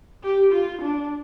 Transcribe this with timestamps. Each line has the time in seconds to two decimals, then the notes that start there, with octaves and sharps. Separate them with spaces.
0.23 G4
0.52 F4
0.82 D4